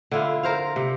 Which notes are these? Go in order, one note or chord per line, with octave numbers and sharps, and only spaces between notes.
D3 E4 F4
A#4 C5 F5
C3